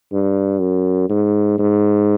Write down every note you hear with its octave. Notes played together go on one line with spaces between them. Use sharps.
G2
F#2
G#2
G#2